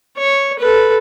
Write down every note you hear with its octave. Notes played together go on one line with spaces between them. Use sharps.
C#5
A4 B4